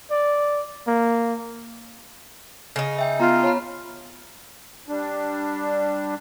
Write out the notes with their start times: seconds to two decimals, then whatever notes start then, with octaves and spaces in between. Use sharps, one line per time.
0.11 D5
0.87 A#3
2.76 C#3 D#4
2.98 E5 G5
3.20 B3 F4 A#5
3.43 C#5 A5 B5
4.88 G3 D4